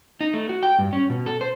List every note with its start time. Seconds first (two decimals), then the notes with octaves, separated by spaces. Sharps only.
0.21 D#4
0.33 A3
0.49 F#4
0.63 G5
0.79 G2
0.93 C#4
1.10 B2
1.26 A4
1.41 C5